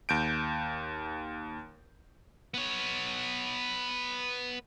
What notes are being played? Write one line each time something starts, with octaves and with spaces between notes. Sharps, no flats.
D#2 G6 D7
B3 C#5